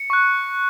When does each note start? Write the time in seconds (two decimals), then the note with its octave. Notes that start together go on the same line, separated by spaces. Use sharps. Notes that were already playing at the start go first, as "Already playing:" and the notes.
Already playing: C#7
0.10 C#6 F#6